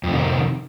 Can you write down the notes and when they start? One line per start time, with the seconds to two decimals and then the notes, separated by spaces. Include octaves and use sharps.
0.03 F2
0.08 C3
0.12 D#3